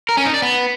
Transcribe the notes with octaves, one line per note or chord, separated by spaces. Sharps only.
A#4
C#4
D#4
D5
B3